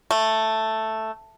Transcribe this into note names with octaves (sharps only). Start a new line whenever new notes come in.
A3